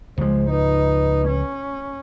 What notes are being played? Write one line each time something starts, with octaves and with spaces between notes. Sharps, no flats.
C#2 F3 G#3 C5
D#4 B4
C#4